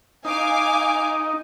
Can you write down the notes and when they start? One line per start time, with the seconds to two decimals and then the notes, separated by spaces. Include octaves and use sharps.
0.25 D#4 F5 G#5 D6